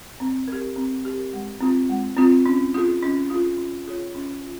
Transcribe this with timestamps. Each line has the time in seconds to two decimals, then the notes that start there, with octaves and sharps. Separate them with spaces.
0.20 C4
0.48 G4 A#4
0.76 C4
1.05 G4 A#4
1.33 G#3
1.60 C4 F4
1.89 G#3
2.17 C4 F4
2.46 C#4
2.74 F4 G#4
3.03 C#4
3.30 F4 G#4
3.58 C#4
3.87 F4 G#4 C#5
4.15 C#4
4.43 F4